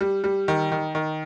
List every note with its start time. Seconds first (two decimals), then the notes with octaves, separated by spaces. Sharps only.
0.01 G3
0.24 G3
0.48 D#3
0.72 D#3
0.95 D#3